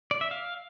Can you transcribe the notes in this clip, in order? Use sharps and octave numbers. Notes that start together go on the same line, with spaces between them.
D5
E5
F5